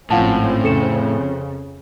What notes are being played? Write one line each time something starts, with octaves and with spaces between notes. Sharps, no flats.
G#1 A2 F3 C4 C#4 F5 F#5 A5
F2 C#3 A4 C#7 E7